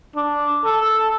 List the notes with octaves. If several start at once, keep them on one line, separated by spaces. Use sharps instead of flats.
D4
A4